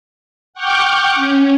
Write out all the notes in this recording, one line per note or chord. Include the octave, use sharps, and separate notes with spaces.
F#5 G5 C#6 D6 F6 G6
C#4